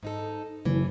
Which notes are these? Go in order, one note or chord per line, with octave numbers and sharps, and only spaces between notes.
G#2 D#4 A4
F#1 E3